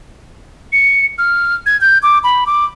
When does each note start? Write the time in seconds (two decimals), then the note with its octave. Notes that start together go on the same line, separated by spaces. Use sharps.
0.73 C#7
1.18 F6
1.66 G#6
1.81 G6
2.03 D6
2.24 B5
2.47 D6